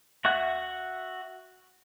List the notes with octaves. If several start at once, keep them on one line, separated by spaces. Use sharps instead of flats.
F#4 E5 F#5 F#6